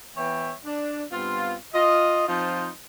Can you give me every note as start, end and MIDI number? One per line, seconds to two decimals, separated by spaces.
0.16 0.52 52
0.16 0.52 59
0.16 0.52 73
0.16 0.52 76
0.16 0.52 79
0.65 1.03 62
1.12 1.54 43
1.12 1.54 59
1.12 1.54 60
1.12 1.54 65
1.73 2.26 65
1.73 2.26 75
2.27 2.69 53
2.27 2.69 60
2.27 2.69 63
2.27 2.69 65
2.27 2.69 72